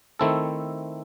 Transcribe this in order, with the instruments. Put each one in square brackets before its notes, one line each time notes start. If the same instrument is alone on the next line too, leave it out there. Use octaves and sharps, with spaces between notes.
[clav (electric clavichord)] D#3 A3 C4 E4 A4